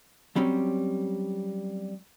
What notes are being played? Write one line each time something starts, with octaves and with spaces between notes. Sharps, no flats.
F#3 G3 C4 C#4